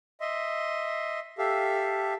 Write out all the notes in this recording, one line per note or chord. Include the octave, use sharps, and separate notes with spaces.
D#5 E5 C6
G4 A4 E5 F5